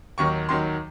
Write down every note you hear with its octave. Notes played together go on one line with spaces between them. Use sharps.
D#2 D#3 F#3 C#6
D#2 D#3 F#3 C6